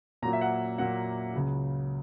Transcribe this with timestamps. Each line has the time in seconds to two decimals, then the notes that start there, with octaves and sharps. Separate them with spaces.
0.22 A#2 F#3 A#3 A#5
0.33 E5
0.41 F#5
0.78 A#2 F#3 A#3 F#5
1.34 C#2 C#3 F#3